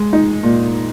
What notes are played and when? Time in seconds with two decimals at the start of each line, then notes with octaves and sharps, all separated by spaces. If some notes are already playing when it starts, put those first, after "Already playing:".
Already playing: G#3
0.13 D#4
0.43 A#2